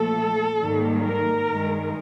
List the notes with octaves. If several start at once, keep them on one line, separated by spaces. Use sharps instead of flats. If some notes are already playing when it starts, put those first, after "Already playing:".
Already playing: A#2 F3 A3 A4
G#2 D#3 G3 A#3
A#4
G2 D#3 G#3